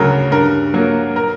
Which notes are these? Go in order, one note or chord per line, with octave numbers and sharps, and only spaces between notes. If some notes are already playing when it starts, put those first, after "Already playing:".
Already playing: D2 C#3 F#3 A#4
G2 A#4
F#3 A#3
A#4